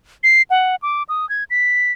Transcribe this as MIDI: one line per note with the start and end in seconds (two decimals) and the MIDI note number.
0.24 0.42 96
0.50 0.76 78
0.82 1.03 86
1.09 1.28 87
1.29 1.44 92
1.50 1.92 95